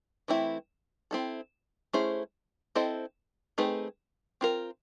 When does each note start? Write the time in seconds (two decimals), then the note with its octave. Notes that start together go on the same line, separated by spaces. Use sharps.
0.28 E3 A3 C4 E4
1.11 C4 E4 A4
1.93 A3 C#4 E4 G#4 C5
2.75 C4 E4 A4 C5 D#5
3.58 A3 C4 D#4 G#4 B4
4.41 C4 F4 A#4